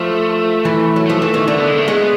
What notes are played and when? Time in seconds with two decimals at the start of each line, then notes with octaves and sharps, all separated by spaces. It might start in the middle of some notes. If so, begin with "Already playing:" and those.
Already playing: F3 A3
0.65 E3
0.96 F#3
1.06 F3 A3
1.22 E3
1.34 D#3
1.47 D3 A3
1.58 B3
1.68 G#3
1.78 A3
1.88 G#3 B3